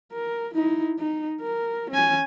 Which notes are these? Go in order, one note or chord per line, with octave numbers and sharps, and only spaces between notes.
A#4
D#4 E4
D#4
A#4
C#4 G#5